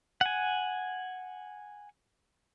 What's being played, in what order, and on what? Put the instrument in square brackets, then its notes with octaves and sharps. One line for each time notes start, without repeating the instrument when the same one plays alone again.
[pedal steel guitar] F#5 G#5